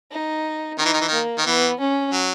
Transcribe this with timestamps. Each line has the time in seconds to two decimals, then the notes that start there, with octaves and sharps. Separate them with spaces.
0.12 D#4
0.79 D#3 D#4
0.85 E3
0.93 D#3
1.01 E3
1.08 D#3 A#3
1.38 D#3
1.46 E3 B3
1.80 C#4
2.13 F#3